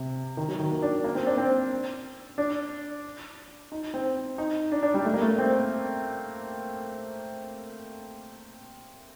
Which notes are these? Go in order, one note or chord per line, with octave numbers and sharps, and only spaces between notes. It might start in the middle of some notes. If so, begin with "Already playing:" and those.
Already playing: C3
D#3
F#3
D#3
A#3
D4
A#3
C4
D4
C4
D4
D#4
C4
D#4
D4
D4
G3
A3
A#3
A3
C4